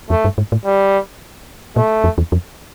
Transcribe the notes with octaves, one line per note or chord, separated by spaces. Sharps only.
F2 A3
G2
G#2
A2
G3
A#2 A3
F2
E2
F2